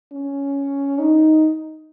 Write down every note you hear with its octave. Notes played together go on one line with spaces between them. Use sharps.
C#4
D#4